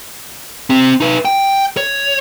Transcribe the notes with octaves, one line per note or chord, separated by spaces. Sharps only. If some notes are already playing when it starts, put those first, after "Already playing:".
C4 G4
D#4 B4
G5
C#5